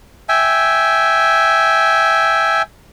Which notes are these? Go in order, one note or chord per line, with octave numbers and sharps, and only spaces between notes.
E5 G5 G#5